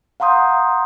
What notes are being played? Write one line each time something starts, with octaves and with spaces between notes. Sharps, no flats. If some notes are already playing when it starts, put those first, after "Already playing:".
F5 F#5 A#5 C6 D#6 G6